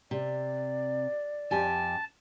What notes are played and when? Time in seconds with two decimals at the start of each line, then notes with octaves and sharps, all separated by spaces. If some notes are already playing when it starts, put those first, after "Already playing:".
0.11 C3 D5
1.51 F2 G4 G#5 A5